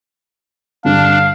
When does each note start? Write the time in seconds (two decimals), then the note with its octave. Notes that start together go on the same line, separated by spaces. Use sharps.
0.85 G2 D3 D4 F5